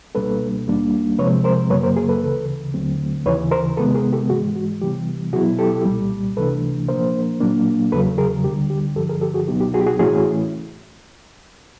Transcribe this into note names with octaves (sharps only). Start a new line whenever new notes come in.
C#2 B2 G3 A#3 D4 A4 B4
D#2 D#3 G3 A#3 D4
C3 F3 G#3 C4 B4 C#5
A#4 C5
F#2 C#3 F#3 A#3 B4 C#5
A#4 C5
G#4 A#4
A4 B4
D2 C#3 E3
D#2 D3 F#3 A3 C4
D#2 C#3 E3 B4 C#5
A#4 C5
C3 D#3 G#3 B3 A4 B4
G#4 A#4
G4 A4
G#2 E3 G#3 F#4 G#4
F#4
C3 E3 G3 B3 G4
B2 F#3 B3 E4 F#4 G#4
G4 A4
C2 A#2 G3
C#2 C3 E3 A3 D4 A4 B4
A#2 F3 A#3 D4 A#4 C5
A#2 F#3 A#3 D4
E2 C#3 F#3 A4 B4
G#4 A#4
D2 D3 G3 G4
G4
G2 D3 F3 G4 A4
G#4 A#4
G4 A4
F#4 G#4
C#2 B2 F#3 B3 D#4 G4
G4
F#4 G#4
G4
F#4 G#4
A2 E3 A3 C#4 E4 F#4 G#4